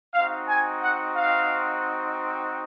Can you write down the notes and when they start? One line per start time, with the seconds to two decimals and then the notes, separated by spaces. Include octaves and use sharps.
0.14 C4 D#4 F#4 F5
0.48 G#5
0.80 F#5
1.14 F5